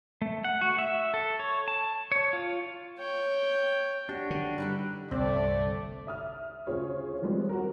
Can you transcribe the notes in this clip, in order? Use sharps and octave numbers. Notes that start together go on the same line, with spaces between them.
A3
F#5
F#4
E5
A4
C#5
A5
C#5
F4
C#5 G5
D4 F#4 G4
D3
G3 D#4 E4 B4
G1 C2 A3 C4 D5
E5 D#6 F6
D2 C#3 F4 G#4 C5 C#5
D#3 F3 G3 G#3 B3 C4
F#4 A#4